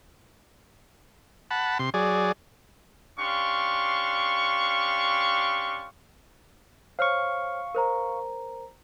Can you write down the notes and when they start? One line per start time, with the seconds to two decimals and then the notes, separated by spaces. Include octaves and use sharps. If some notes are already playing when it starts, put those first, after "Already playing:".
1.51 F#5 A5 B5
1.79 C3 C6
1.94 F#3 G#4 D5
3.19 C#4 D4 G4 F5 C6 C#6
6.99 C5 C#5 F5 C#6 F6
7.75 A#4 C5 A#5